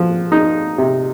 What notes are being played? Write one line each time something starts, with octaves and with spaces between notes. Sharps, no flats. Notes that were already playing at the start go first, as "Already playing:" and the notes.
Already playing: F3
D#4
C3